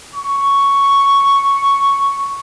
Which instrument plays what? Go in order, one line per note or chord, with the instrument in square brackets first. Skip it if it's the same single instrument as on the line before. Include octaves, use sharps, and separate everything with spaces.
[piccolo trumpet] C#6